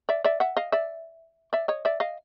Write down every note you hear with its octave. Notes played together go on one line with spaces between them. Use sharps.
D5 E5
D5 E5
E5 F#5
D#5 F5
D5 E5
D5 E5
C#5 D#5
D5 E5
D#5 F5